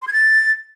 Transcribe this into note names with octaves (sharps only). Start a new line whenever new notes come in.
C6
G#6
A6